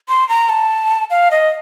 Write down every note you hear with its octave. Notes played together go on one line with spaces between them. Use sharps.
C6
A#5
A5
F5
D#5